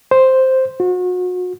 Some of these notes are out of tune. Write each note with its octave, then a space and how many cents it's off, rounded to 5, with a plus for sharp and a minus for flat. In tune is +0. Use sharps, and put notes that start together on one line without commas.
C5 +0
F#4 -35